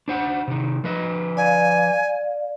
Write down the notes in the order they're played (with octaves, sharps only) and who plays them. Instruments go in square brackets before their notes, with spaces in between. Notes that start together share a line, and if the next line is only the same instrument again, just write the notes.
[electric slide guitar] D4 C5 F#5
C3 D#3
F3 B4 D#5
[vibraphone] D5 F5 [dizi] G#5